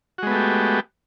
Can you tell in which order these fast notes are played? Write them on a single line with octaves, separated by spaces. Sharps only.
F#4 G#3 B3 A3 G4